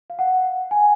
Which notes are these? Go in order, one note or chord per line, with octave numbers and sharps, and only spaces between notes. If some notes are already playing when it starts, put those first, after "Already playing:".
F5
F#5
G#5